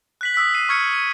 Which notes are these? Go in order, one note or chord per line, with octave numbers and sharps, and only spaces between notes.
F#6 B6 F#7
D#6 E6 F#6 B6
B6 C7 D#7
C#6 F6 G#6 C#7
D#7